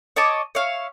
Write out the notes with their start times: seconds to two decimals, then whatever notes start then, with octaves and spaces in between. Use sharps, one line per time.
0.16 C#5 D#5 A5 D6
0.55 C#5 E5 F5